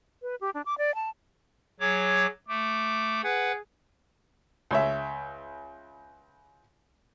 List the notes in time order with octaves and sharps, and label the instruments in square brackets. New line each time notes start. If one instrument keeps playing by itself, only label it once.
[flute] B4
G4
D4
D6
D5
A5
[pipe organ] F#3 C#5 D6 [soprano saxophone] G#4
[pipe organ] A3 [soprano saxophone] D6
[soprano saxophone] G#4 [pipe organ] B4 F#5
[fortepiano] C#2 C#5 E5